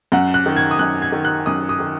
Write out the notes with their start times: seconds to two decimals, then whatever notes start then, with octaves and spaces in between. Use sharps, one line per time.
0.12 F#2 F#5
0.34 F#6
0.46 D#3
0.56 G#6
0.71 D#6
0.79 F#2 F#6
1.02 G#6
1.12 D#3
1.25 F#6
1.46 F#2 D#6
1.69 D#6
1.80 D#3